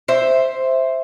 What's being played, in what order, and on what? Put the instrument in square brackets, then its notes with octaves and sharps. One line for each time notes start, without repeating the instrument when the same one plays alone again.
[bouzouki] C5 E5